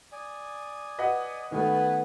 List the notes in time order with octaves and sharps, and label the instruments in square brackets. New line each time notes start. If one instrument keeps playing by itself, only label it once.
[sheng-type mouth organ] D5 G#5 D#6
[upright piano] B4 D#5 F#5
[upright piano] D#3 A3 [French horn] B3 [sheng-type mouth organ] B4 G#5